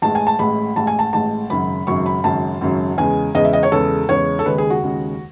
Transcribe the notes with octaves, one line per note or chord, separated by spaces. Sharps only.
A1 A2 G#3 A5
G#5
A5
A1 A2 G#3 B5
A1 A2 G#3 A5
G#5
A5
A1 A2 G#3 A5
G#1 F#2 C#3 F#3 B5
G#1 F#2 C#3 F#3 C#6
B5
G#1 F#2 C#3 F#3 A5
G#1 F#2 C#3 F#3
E2 C#3 G#3 G#5
E2 C#3 G#3 D#5
E5
D#5
C#5
E2 C#3 G#3 A4
E2 C#3 G#3 C#5
A4
D#2 C#3 G#3 B4
G#4
F#4
D#2 C#3 G#3